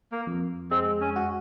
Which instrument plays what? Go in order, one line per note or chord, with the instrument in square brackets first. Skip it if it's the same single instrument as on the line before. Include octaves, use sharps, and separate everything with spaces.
[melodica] A#3
[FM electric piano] F2
[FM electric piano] G#3 [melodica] C4
[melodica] C#4
[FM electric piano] F#4